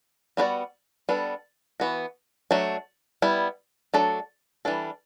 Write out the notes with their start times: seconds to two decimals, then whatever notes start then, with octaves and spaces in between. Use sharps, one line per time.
0.37 G3 B3 F#4 B4 D5
1.09 G3 B3 D4 A4
1.80 E3 B3 F#4
2.51 F#3 A3 D4
3.22 G3 B3 E4
3.94 F#3 A3 D4 A4 D5
4.65 E3 G3 D4 A4